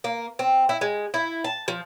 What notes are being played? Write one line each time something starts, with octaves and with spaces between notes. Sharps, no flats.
A#3
C4
E4
G#3
E4
A5
F3